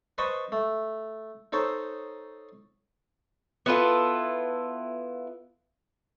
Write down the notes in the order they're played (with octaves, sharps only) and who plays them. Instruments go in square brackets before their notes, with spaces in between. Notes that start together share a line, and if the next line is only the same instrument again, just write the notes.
[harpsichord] B4 C5 D#5 A5 B5 C#6
A3
D#4 A4 C5 C#5
[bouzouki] B3 E4 F4 A4